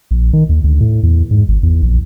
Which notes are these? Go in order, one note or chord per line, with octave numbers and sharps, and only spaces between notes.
A#1
D#3
D#2
D2
A2
E2
G#2
G#1
E2
A#1